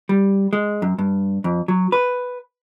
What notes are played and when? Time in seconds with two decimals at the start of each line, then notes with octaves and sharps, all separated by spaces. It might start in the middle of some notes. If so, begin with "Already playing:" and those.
0.09 G3
0.53 G#3
0.82 F#2
0.99 G2
1.44 F2
1.68 F#3
1.92 B4